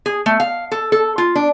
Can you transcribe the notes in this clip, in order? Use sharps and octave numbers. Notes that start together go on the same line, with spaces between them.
G#4
A3
F5
A4
A4
F4
D4